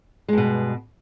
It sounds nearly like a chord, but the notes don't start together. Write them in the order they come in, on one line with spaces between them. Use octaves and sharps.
G#3 G2 B2